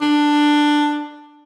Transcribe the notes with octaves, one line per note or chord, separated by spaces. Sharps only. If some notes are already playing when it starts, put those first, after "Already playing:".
D4